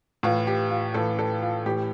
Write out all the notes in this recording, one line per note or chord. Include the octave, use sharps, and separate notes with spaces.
A2 E3 F4
G4
F4
A2 E3 A4
A4
F4
A2 E3 G4